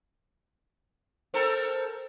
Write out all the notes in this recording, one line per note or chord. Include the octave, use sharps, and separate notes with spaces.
C4 A4 A#4